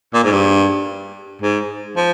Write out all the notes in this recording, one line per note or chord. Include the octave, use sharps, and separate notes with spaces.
A#2
G#2
G2
G#2
F3